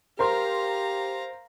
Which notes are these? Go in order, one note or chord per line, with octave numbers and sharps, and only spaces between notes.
G4 A#4 C5 F5 A#5 C6